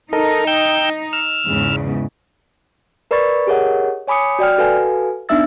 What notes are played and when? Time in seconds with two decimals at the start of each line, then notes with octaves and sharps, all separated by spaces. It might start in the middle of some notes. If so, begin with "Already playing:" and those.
0.13 D#4 A4 A#4 D#5
0.47 G5 E6 G6
1.13 E6 F6
1.47 E2 G#2 C#3
3.11 A#4 B4 D5 B5 C#6 A6
3.47 G4 G#4 A#4 C#5 D#5 F#5
4.08 C#5 G#5 B5 D6 D#6 C#7
4.39 F#4 D5 G5 F6
4.58 F#4 A4 B4 F5 G#5
5.29 B3 D4 D#4 E5 E6 A6